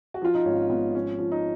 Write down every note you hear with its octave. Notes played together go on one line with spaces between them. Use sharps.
F#4
F3 F4
D#4
G#1 C#4
G#1 B3
F3 C#4
F3
D#4